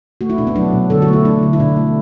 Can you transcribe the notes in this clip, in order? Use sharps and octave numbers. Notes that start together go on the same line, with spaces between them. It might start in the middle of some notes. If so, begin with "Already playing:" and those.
A3 F#4
E4
B2 D4
B3
F#3 D4
B2
D3 A4
F#4
A3 E4
A3 D4
D3
E4
B2 D4
A3